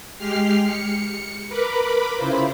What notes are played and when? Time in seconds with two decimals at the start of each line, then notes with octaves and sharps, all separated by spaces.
0.18 G#3 G4 F6 C7
0.66 C#7
1.49 A#4 B4 B5 D6
2.16 C#3 E4 F4 C5